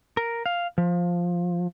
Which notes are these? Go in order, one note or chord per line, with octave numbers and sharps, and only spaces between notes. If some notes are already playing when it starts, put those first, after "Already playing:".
A#4
F5
F3